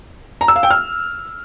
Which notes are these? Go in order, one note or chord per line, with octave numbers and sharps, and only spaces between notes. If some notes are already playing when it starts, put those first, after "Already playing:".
A#5
E6
F5
G5
F6